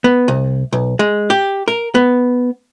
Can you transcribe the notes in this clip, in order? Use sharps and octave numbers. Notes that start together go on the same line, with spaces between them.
B3
C2
B1
G#3
G4
A#4
B3